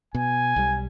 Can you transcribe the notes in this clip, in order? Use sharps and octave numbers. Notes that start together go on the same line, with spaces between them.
B2 G#5
B1 G3